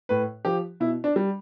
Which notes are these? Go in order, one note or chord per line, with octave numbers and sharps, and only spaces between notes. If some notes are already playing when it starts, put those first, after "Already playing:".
A2 B4
F3 G4
B2 E4
D4
G3